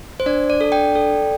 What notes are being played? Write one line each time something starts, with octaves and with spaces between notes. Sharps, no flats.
C5
D4 D5
D5
A4
D5 G5
A4